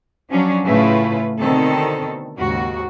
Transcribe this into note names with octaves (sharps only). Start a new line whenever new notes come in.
F3 F#3 C#4 D4
A2 C#3 A3 E4 F4 B4
B2 D3 D#3 C4 A4
D#2 G#2 C#3 F#4